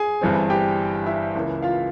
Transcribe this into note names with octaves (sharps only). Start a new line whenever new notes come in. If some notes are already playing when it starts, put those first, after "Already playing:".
Already playing: G#4 G#5
G1 G2 E3 G3 C4
G4 G5
E4 E5
C#2 C#3 E3 A#3
F4 F5